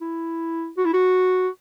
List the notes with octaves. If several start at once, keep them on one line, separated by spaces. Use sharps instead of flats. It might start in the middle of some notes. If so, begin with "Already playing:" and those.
E4
F#4
E4
F#4